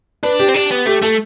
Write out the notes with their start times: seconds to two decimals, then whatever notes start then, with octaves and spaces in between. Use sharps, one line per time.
0.23 D4 B4
0.39 G4
0.49 C4
0.55 D4 G4
0.72 B3
0.87 A3 G4
1.02 A3 A4